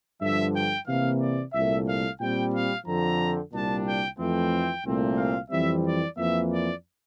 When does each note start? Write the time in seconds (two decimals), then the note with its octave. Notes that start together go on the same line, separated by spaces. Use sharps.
0.21 G2 D3 F3 E5
0.54 G5
0.87 C3 E3 A#3 F5
1.20 D5
1.53 C2 A#2 A3 E5
1.86 F5
2.20 A#2 G3 C4 G5
2.52 F5
2.85 F2 D3 F3 C4 A#5
3.53 C2 A#2 G3 D4 A5
3.85 G5
4.18 F2 E3 A3 C4 G5
4.85 C2 A#2 A3 C4
5.17 F5
5.50 F2 E3 G3 C4 E5
5.84 D5
6.17 F2 E3 A#3 E5
6.51 D5